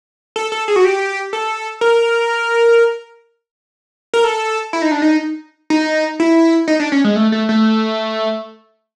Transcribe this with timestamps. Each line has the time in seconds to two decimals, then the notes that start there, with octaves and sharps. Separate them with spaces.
0.36 A4
0.52 A4
0.68 G#4
0.76 F#4
0.85 G4
1.33 A4
1.81 A#4
4.14 A#4
4.24 A4
4.73 E4
4.82 D#4
4.91 D4
5.02 D#4
5.70 D#4
6.20 E4
6.68 D#4
6.80 D4
6.92 C#4
7.04 G#3
7.16 A3
7.32 A3
7.49 A3